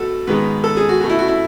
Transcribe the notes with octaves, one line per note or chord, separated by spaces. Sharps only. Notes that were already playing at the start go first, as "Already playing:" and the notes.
Already playing: B2 A3 F#4 A4
G#2 D#3 G#3 B3 B4
A4
G#4
F#4
B2 A3 F#4
E4
F#4
E4